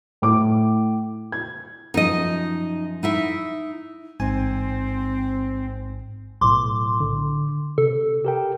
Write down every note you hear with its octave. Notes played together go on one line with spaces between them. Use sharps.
A2 D6
G#6
F#2 F3 D#4 D#5
D#4 E4 E5
A1 G#2 C4 G#5
B1 A2 C6 D6
D3
C3 A4
G4 A#4 G5